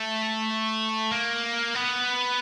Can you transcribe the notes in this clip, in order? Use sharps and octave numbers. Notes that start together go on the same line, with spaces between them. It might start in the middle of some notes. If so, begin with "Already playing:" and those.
Already playing: A3
A#3
B3